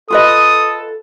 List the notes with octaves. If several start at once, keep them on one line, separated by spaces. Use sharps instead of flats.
F4 A4 B4 D#5 D#6